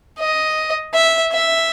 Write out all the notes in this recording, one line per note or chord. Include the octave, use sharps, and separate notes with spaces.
D#5
E5
E5